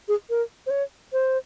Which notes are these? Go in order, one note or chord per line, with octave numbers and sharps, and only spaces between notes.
G#4
A#4
C5
C#5
C5